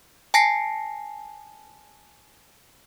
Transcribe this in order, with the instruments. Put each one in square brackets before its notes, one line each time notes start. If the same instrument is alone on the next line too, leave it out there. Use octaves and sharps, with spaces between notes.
[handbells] G#5 A5 A#6 C7